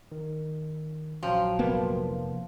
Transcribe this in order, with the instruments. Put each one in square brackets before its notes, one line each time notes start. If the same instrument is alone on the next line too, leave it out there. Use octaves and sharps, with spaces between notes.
[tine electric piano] D#3
[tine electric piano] A#1 F#3 G5 [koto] F3
[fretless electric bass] F1 A#3 B3